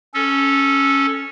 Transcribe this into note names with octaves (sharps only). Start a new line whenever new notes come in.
C#4 A4